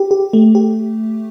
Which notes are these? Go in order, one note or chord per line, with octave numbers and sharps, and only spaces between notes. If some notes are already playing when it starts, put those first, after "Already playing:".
Already playing: G4
G4
A3
G4